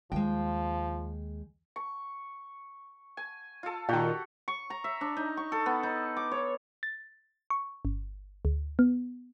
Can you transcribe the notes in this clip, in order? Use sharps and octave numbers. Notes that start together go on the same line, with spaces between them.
D#2 F3 G#3 G5
C#6
G#5
F4 A4
A#2 D#3 F#4 G4
C#6
A#5
E5
D4
D#4
C#6
A4
B3
D#4
D6
C#5
A6
C#6
G1
D2
B3